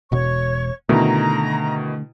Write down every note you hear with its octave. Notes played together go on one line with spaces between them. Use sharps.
E1 B2 C#5 C#6
B2 D3 D#3 A3 E4 A#5